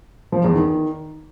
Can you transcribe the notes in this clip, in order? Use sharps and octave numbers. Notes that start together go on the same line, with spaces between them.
F3
E2
D#3